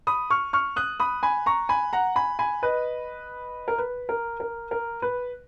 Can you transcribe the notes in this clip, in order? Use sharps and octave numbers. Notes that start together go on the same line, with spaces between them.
B5 D#6
C#6 F6
C#6 F6
D#6 F#6
B5 D#6
G#5 B5
A#5 C#6
G#5 B5
F#5 A#5
G#5 B5
G#5 B5
B4 D#5
A#4
B4
A#4
A#4
A#4
B4